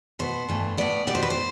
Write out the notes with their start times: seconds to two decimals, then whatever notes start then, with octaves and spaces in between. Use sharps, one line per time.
0.19 B2 B3 C5
0.48 G2 E3 A3
0.77 A2 F3 B3 D5
1.07 B2 G3 B3 D5
1.15 C5
1.23 B4
1.30 C5